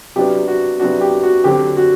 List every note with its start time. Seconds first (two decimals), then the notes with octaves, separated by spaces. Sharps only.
0.16 C3 F#3 B3 D4 G4
0.48 F#4
0.80 C3 F#3 B3 D4 F#4
1.01 G4
1.23 F#4
1.44 D3 F#3 C4 G4
1.77 F#4